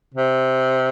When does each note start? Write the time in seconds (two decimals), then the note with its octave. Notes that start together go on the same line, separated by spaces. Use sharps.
0.14 C3